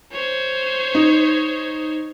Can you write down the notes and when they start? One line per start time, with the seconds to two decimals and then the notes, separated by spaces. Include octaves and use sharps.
0.12 C5 C#5
0.95 D#4